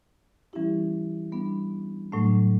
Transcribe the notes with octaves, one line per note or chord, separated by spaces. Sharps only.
E3 G3 C#4 E4 G4
G3 B3 D4
A2 F#3 A3 D4